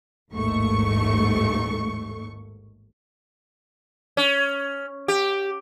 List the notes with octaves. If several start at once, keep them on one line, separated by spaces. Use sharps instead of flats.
A1 D#2 G#2 A3 C#6
C#4
G4